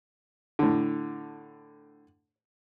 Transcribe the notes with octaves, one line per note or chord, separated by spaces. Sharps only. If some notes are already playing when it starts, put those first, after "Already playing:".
A2 D3